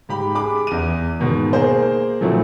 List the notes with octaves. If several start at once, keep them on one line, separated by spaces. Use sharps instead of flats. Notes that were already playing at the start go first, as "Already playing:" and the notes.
G#2 G4 B5
G#4 B5 D6
E2 D#7
G#2 B2 D#3
A#3 G#4 A#4 C5
A#2 F3 F#3 A3 C4 E4